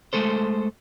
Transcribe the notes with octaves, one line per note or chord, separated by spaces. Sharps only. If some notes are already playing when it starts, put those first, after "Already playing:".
G#3 A3 A4 C5